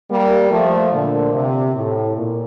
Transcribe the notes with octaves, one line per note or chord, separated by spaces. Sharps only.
G3 A#3
F3 A3
A#2 D3
C3
A2
A#2